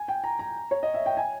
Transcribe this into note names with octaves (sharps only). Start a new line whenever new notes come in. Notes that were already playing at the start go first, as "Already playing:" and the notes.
Already playing: G#5
G5
A#5
A#5
C#5
D#5
E5
G5
G#5